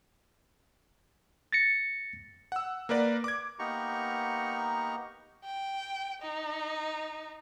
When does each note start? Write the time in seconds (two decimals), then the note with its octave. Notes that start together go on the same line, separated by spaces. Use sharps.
1.53 A6 A#6 C#7
2.52 F#5 E6
2.89 A#3 A#4 B4 D5
3.24 D6 G#6
3.59 A#3 B3 D#4 G4 A#5 C#6
5.45 G5
6.22 D#4